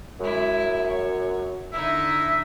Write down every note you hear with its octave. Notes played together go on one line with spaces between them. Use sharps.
F#2 G#3 E4
C#5
D3 D#4 E4 E5